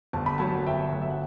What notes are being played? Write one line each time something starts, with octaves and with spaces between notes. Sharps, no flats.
G1 A5
B5
F#3 F#5 A5
G1 E5 G5
F#3
E5
F#5